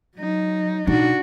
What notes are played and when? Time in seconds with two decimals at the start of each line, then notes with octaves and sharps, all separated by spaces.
0.16 F#3 D#4
0.87 B2 D4 D#4 F#4